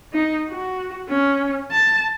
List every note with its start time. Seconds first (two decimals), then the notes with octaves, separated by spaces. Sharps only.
0.13 D#4
0.49 F#4
1.08 C#4
1.71 A5